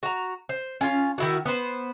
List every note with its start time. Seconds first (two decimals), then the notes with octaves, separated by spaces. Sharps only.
0.03 F#4 A#5
0.49 C5
0.81 C#4 F4
1.18 D#3 E4 F#4
1.45 B3 B4 C5